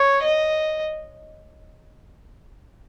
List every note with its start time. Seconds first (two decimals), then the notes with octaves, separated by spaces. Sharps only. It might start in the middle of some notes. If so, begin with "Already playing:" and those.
Already playing: C#5
0.23 D#5